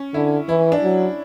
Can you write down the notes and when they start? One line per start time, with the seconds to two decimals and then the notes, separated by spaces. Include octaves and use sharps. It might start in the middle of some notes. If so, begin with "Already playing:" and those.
Already playing: C#4
0.14 D3 E4
0.49 E3 E4
0.72 D4
0.83 F#3